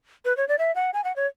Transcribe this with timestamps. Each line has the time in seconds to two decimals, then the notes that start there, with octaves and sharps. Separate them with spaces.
0.25 B4
0.37 C#5
0.48 D5
0.58 E5
0.75 F#5
0.93 G#5
1.04 F#5
1.16 C#5